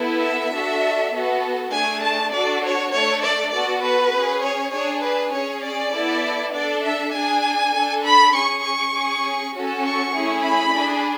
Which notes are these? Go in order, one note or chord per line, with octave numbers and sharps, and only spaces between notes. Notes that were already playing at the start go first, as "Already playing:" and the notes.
Already playing: B3 E4 A4
E5
D4 F#4 A4
B3 F#4 A4
A3 D4 G#4 G#5
A5
D4 F#4 A4 D5
C#5
A3 D4 A4 C#5
D5
B3 F#4 A4 D5
B4
C#4 G#4
C#5
D4 G#4 C#5
B4
C#4 G#4 C#5
D5
B3 E4 A4
D4 A4 D5
E5
D4 G#4 G#5
D4 A4
B5
C#4 G#4 C#6
C#6
C#4 G#4
C#4 F#4 A4
C#6
A3 C#4 E4 G#4
B5
D4 G#4